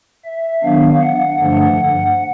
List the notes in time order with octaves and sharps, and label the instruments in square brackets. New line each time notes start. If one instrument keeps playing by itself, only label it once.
[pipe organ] E5
D#3 F#3 B3 D4 F5
F#5
G2 D3 F3 A3 D4